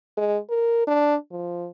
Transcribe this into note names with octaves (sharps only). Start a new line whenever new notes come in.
G#3
A#4
D4
F3